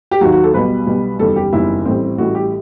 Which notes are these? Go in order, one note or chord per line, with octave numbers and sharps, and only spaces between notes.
G4
D#2 D#3 F#3 F#4
F#4
A4
B1 B2 G3 B4
B1 B2 G3
F#1 E2 D#3 G3 A4
G4
F#1 E2 D#3 G3 E4
A1 A2 G3 C4
A1 A2 G3 F#4
G4